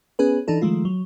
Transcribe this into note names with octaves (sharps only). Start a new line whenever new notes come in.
B3 C#4 G#4 B4
E3 D4 D#4 A4
D#3 F3 G#3 A3 F4
F#3